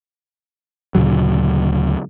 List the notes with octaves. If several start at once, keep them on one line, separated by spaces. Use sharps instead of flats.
D2 A#2 C#3 F#3